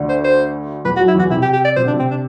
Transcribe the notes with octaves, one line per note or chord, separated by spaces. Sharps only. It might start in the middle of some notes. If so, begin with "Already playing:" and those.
Already playing: D2 D3
C5
C5
E2 E3 B4
F#4
F#2 F#3
E4
E2 E3 F#4
C3 E4
G4
G4
D5
C3 C5
D3 D4
C3
C4
D4